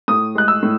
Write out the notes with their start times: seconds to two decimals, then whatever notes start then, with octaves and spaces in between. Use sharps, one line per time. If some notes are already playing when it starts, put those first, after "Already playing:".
0.08 A2 D#6
0.35 G#3 F#6
0.48 E6
0.63 A2